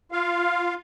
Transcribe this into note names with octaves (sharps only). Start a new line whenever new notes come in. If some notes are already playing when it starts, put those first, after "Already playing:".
F4 F5